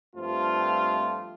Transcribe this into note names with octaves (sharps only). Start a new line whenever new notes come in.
G2 F3 A3 C4 F4